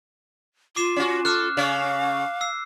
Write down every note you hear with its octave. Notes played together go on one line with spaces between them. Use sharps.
F4 D6 C7 E7
C#4 F#4
A4 D6 F6 F#6
C#3 C#4 F5
E6 C7